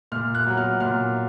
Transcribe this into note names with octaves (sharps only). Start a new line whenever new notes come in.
A#2 F6
F#6
F#3 B3
F6
A#2 F6